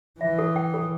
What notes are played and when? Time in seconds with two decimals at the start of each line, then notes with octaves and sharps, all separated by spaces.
0.20 E3 E5
0.39 A4
0.56 G5
0.74 A4